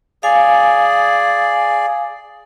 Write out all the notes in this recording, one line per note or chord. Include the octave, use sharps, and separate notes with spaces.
G#4 D5 F5 G#5